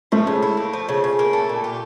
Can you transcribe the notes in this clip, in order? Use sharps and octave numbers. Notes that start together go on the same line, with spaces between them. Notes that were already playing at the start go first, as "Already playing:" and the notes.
F3 A3
C#3
E4
A#3
F3
C#3
C#3
A#3
A3
A#2
G4